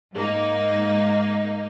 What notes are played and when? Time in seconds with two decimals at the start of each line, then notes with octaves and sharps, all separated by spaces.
0.13 G#2 A#3 D#4